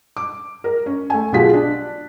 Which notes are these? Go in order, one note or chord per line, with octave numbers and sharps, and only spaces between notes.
D6
A#4
C#4
A3 G#5
B1 B2 F4 G4 G#4 B6
D4